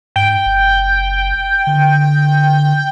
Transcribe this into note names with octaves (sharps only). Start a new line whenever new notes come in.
G#2 G5
F#1
D3